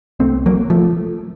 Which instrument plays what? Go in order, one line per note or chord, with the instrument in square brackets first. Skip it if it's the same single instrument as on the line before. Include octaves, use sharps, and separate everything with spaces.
[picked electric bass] C2 C3 A3 C4
F#3 A#3
F3 A3